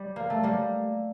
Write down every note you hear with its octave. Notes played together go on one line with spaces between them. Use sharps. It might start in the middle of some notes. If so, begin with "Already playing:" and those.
Already playing: G3
A#3
A3
G3 A#3